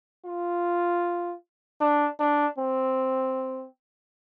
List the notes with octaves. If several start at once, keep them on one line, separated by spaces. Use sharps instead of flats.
F4
D4
D4
C4